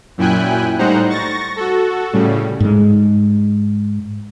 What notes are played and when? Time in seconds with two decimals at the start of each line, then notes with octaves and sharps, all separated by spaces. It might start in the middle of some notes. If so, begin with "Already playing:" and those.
0.18 F#2 A#2 E4 G5 G#5 F#6
0.79 A2 G3 D#4 C5 F#5 A#5
1.09 C#6 A6 A#6
1.56 F#4 A4
2.13 A2 C#3 G3
2.60 G#2 G#3